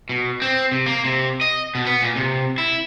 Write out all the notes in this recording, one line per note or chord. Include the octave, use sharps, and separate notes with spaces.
B2
C4
C3
A#3
C3
D#5
B2
B3
A#2
C3
E4